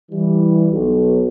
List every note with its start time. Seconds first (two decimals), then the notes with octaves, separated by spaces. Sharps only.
0.11 E3 G3
0.71 B1